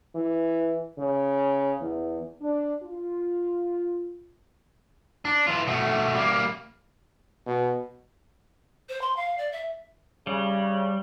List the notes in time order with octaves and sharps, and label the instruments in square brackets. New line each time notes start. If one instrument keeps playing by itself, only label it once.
[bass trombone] E3
C#3
E2
[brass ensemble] D4
F4
[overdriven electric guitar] D4
E3 F4
B2 A3
G3 A#3
[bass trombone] B2
[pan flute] C5
C6
F5
D5
E5
[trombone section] C#3 [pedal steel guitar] G3